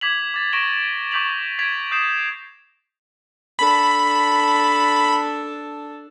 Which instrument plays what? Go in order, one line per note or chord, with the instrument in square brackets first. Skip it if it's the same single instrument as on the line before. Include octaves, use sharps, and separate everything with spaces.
[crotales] D6 G#6 B6 F7 F#7
D6 A6
C#6 A#6 D7 E7 G7
C#6 D6 G6 B6 F7 F#7
G#6 A6 B6 D7 F7
D#6 G6 C7 E7
[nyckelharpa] D4 A4 [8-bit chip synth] B5